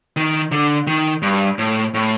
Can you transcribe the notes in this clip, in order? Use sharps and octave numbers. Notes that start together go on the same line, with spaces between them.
D#3
D3
D#3
G2
A2
A2